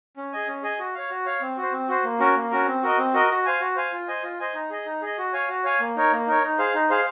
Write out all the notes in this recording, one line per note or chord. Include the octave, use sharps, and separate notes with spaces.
C#4
G#4 D#5 G#5
C#4
G#4 D#5 G#5
F#4
C#5 F5
F#4
C#5 F5
C4
F#4
C5
C4
F#4 C5
A#3
C#4 F#4 A#4
A#3
C#4 F#4 A#4
C4
F#4 A#4 D#5
C4
F#4 A#4 D#5
F#4
C5 F5 G#5
F#4
C5 F5 G#5
F4
C5 D#5 G#5
F4
C5 D#5 G#5
D#4
G#4 D#5
D#4
G#4 D#5
F#4
C#5 F5 G#5
F#4
C#5 F5 G#5
A#3
D#4 A#4 C#5
A#3
D#4 A#4 C#5
D#4
G#4 C5 F5
D#4
G#4 C5 F5